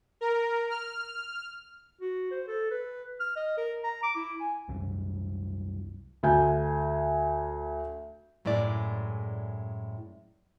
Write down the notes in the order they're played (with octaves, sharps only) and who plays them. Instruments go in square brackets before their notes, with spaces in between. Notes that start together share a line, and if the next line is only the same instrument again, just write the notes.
[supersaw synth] A#4
F6
[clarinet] F#4
C5
A4
B4
F6
D#5
A#4
A#5
D6
E4
G#5
[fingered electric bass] C2 F#2
[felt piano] D2 G#5 G6
[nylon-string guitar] F#2 A2 G#3 E4 D5